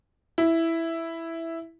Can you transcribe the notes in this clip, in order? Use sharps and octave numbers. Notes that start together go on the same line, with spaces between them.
E4